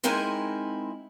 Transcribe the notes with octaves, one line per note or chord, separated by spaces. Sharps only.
G#3 C4 D#4 E4 A#4 G#5